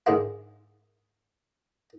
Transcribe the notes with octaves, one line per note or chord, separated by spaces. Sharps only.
G#2 D3 D#3 G#3 E4 F4